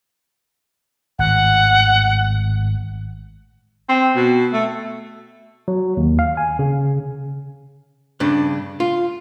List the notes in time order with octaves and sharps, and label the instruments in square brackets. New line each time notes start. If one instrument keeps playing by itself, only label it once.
[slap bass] G#1 A2 [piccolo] F#5
[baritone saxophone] C4
B2
A3
[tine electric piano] F#3
D#2
F5
G#5
C#3
[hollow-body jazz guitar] G2 C#3 D4
F4